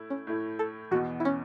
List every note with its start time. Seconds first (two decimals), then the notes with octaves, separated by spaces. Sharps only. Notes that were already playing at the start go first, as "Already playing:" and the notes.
Already playing: A2 A3 E4
0.10 C#4
0.27 A2 A3 E4
0.59 A4
0.91 E2 B2 B3 F#4
1.20 E4
1.25 C#4